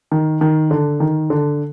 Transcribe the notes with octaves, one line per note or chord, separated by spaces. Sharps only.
D#3
D#3
D3
D#3
D3